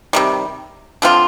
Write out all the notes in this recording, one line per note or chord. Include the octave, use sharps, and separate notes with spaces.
C3 D#3 G3
D3 F3 C4 F4